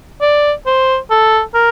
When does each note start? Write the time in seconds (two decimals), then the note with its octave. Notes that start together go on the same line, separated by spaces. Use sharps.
0.21 D5
0.66 C5
1.10 A4
1.54 A#4